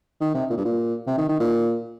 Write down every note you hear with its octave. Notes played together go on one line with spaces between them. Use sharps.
D#3
C3
A#2
G2
A#2
C3
D#3
D#3
A#2